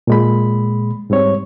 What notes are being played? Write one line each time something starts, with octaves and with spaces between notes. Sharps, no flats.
A#2 G#3 B5
G#2 G3 C4 C#5